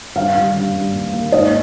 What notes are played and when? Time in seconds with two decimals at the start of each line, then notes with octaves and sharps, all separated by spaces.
0.15 G2 F5
0.35 G3
0.54 G2
0.74 G2
0.93 A#3
1.13 A#3
1.32 G#2 D#5